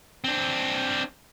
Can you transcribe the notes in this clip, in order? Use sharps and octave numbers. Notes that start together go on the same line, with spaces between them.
C4 D4